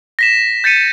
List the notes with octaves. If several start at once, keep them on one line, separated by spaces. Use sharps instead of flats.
A#6 B6 E7
G6 A6 B6 C#7 D#7 E7